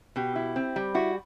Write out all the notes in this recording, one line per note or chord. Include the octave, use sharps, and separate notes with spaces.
B2 G4
E4
C4
G3
E4 F#4